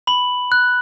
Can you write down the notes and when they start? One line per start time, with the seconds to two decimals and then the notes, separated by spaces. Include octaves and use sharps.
0.07 B5 F#7
0.52 F#6